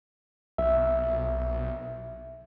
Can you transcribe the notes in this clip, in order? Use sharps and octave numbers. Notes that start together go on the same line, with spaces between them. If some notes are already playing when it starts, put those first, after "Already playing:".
B1 E5